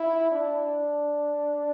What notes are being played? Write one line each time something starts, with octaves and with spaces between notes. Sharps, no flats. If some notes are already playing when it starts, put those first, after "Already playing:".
Already playing: E4
D4